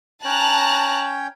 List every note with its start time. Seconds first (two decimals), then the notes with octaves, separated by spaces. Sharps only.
0.25 C#4 C#5 G5 A5 A#5 F#6